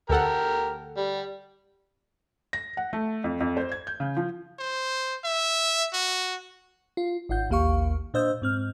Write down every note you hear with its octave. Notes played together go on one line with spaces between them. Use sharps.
D2 G4 A4 A#4 F#5
G3
A#6
F#5
A3
F2
F2
C5
G#6
G6
C#3
F3
C5
E5
F#4
F4
G#1 F4 F#5 G6
A1 D#2 A#3 G4 F5 C#6
A#2 D4 C5 D#5 E6 G6
G#2 C4 F6